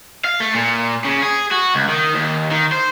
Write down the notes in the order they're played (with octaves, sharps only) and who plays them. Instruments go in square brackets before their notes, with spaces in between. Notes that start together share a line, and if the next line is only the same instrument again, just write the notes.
[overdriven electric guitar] F5
A3
A#2
C#3
G#4
F#4
C#2
D#3
D#2
D#3
C5